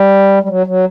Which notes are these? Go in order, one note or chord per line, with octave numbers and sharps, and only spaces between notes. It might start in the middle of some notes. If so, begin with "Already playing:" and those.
Already playing: G3
G3
F#3
F#3